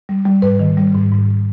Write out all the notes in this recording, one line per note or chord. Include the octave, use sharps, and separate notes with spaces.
G3
G3
G#2 B4
D#3
G3
G#2
G#2